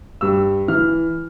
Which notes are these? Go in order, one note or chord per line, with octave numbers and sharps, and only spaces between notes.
G2 E6
E3 F6